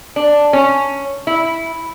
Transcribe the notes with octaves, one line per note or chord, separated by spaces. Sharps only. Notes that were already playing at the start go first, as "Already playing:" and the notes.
D4
C#4
E4